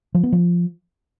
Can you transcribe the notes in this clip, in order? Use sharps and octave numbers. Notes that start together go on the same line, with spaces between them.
F3
B3
F3